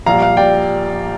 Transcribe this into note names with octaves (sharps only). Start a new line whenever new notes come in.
A#1 A#2 G3 F5 A#5
F5
A#2 G3 D5 G5